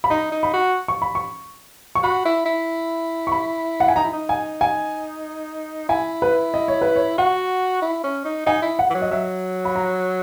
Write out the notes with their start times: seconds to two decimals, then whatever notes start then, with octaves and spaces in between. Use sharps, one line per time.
0.04 B5
0.10 D#4 A#5
0.32 D#4
0.43 B5
0.54 F#4
0.88 C#6
1.02 B5
1.15 C#6
1.95 C#6
2.03 F#4 B5
2.25 E4
2.46 E4
3.27 C#6
3.32 B5
3.80 F#5
3.88 G#5
3.96 D#4 A#5
4.04 E4
4.13 D#4
4.29 G#5
4.61 G#5
5.89 E4 G#5
6.22 B4
6.54 D#5
6.68 C#5
6.81 B4
6.96 C#5
7.18 F#4 F#5
7.82 E4
8.04 C#4
8.25 D#4
8.47 D#4 G#5
8.62 E4
8.79 F#5
8.91 E3
8.95 F#3
9.02 D#5
9.11 F#3 E5
9.65 B5
9.76 A#5